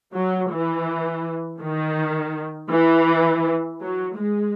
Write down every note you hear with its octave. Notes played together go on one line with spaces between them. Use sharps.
F#3
E3
D#3
E3
F#3
G#3